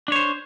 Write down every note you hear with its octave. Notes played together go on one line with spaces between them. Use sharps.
D4 C5 C#5